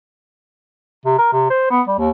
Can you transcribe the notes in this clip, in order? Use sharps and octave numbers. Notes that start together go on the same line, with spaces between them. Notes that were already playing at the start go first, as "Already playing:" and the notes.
C3
A#4
C3
C5
B3
G3
D#2